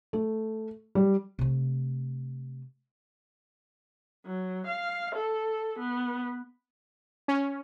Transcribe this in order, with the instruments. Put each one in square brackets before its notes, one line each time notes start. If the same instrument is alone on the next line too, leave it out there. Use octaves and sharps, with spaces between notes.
[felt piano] A3
G3
[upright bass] C3 A3
[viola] F#3
F5
A4
B3
[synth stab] C#4